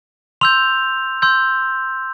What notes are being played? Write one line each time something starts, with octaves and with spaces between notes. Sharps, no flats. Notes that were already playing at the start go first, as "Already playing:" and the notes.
C6 E6 G6 F7
C6 E6 G6